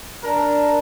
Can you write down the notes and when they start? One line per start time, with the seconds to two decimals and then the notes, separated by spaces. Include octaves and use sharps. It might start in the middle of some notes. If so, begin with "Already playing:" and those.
0.23 D4 A#4